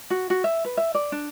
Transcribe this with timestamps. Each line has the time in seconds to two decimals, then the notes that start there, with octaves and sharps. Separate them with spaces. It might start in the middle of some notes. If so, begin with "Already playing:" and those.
0.10 F#4
0.30 F#4
0.44 E5
0.65 B4
0.77 E5
0.95 D5
1.12 D4